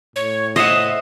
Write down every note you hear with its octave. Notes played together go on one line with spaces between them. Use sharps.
A2 C#5
C5 D#5 E5 F#5 D#6